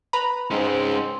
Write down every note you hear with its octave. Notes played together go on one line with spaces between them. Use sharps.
B4 A#5 B5
G#2 G#3 C4 C#4